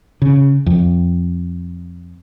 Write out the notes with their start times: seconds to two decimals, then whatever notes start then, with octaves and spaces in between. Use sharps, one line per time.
0.22 C#3
0.66 F2